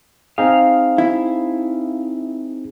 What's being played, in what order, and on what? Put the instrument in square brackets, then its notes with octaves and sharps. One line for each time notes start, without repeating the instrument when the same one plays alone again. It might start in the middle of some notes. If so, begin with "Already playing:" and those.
[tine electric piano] C4 D#4 G#4 [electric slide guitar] F5
[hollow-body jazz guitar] E4